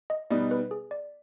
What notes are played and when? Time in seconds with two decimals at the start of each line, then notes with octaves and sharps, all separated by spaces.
0.10 D#5
0.30 B2 G3 B3 D#4 D5
0.51 B4
0.71 G#4
0.91 D5